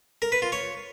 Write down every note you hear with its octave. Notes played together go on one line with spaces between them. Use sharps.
A#4
B4
F4
C#5